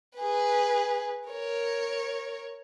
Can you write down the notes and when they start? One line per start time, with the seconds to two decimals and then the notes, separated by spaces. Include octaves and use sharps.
0.18 G#4 B4
1.29 A#4 C#5